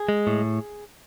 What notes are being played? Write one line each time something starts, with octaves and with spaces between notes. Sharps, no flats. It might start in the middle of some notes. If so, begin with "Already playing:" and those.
Already playing: G#4
G#3
A2